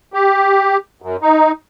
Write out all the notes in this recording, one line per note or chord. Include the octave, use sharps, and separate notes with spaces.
G4
F#2
D#4